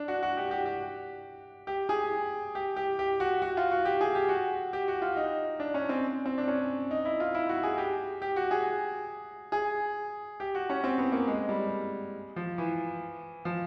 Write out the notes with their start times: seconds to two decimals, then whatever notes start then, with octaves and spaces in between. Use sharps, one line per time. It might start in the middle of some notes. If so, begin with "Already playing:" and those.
Already playing: D4
0.08 F#4
0.23 F#4
0.37 G4
0.51 G4
0.66 G4
1.67 G4
1.89 G#4
2.55 G4
2.76 G4
2.99 G4
3.20 F#4
3.42 F#4
3.57 F4
3.72 F#4
3.85 G4
4.01 G#4
4.15 G4
4.29 F#4
4.73 G4
4.88 F#4
5.02 F4
5.17 D#4
5.60 D4
5.74 C#4
5.89 C4
6.26 C4
6.38 D4
6.48 C#4
6.91 D#4
7.05 E4
7.20 F4
7.35 E4
7.49 F#4
7.63 G#4
7.78 G4
8.22 G4
8.36 F#4
8.51 G#4
9.52 G#4
10.40 G4
10.55 F#4
10.70 C#4
10.84 C4
10.98 B3
11.12 A#3
11.27 G#3
11.49 G3
12.36 F3
12.58 E3
13.45 F3